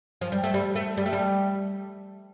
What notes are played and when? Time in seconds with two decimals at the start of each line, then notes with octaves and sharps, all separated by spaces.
0.21 F3
0.32 G3
0.43 A3
0.54 G3
0.75 A3
0.97 G3
1.06 A3
1.13 G3